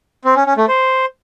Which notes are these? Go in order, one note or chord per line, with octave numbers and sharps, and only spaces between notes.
C4
C#4
C#4
A3
C5